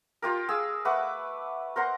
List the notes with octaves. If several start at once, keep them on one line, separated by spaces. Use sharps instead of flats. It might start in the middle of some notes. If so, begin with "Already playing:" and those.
F4 G4 A#4
G#4 F5 E6
A3 B4 F#5 D6
A#4 C5 F#5 A#5